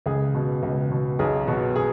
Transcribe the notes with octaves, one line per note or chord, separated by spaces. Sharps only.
C#2 G#4
B2
C#2
B2
B1 G#4
B2 F#4
G#4